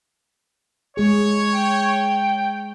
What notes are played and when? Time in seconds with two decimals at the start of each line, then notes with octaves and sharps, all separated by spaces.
0.97 G#3 G#4 C#5
1.54 G5